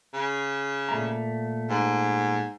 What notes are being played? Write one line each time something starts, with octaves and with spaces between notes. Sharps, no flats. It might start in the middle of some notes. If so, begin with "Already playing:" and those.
C#3
A#2 A3 A#5
G#2